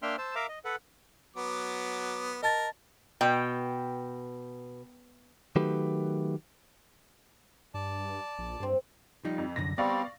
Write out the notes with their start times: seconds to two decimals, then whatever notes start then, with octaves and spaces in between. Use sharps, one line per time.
0.02 A#3 D4 E5 G5 C6 F6
0.18 C5 A5 E6
0.35 A#4 E5 F5 A#5 D6
0.49 D#5
0.65 A4 B4 F#5
1.36 F#3 B3 D6
2.43 A#4 D#5 A5 A6
3.21 B2 G5
5.56 D#3 F#3 A3 G4 B4
7.74 G2 D5 A5
8.38 A#1
8.60 G2 A#3 C4
9.25 F3 G3 D#4
9.38 F2
9.56 C2 F#2 D3 A#6
9.78 G3 B3 C4 D5 F5 C#6